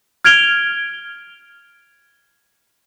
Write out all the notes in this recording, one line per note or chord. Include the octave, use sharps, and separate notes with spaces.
F6 G#6 D7 F7 G7